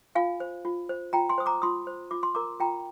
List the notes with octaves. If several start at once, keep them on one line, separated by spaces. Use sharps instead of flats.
F4 F5 G#5
C5
F4
C5
F4 G5 A#5
G#5 C6
C5 D#6
A#5 D6
F4 C6 D#6
C5
F4 D6
C6
A#4 A#5 D6
F4 G5 A#5